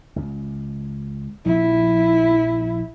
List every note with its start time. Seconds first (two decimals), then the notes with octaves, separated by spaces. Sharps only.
0.16 C#2
1.45 A#1 F3 E4